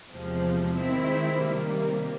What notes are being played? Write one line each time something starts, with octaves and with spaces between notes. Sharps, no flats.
E2 C3 F3 G#3
D#3 G#3 C4 E4
C3 D#3 G3 A#3